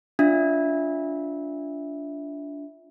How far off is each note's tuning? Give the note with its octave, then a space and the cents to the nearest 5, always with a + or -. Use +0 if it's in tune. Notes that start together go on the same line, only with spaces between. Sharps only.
D4 -20 F4 +0 E5 -15